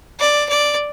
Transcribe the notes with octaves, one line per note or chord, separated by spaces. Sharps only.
D5
D5